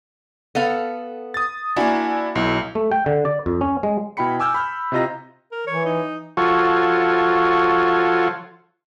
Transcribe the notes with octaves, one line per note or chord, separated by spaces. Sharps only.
B3 A4 F5
D#6 A6
A#3 D4 E4 F#4 G#5
B1 E4
A3
G5
D3
D5
F2
C#4
G#3
B2 E4 G5 B5 C#7
G#5 D6 E6 F6 G6
B5 F6 G6
C3 E4 F4 D#5 A#5 A#6
A#4
E3 C#5
D#4
F3 F4 F#4 A4 C#5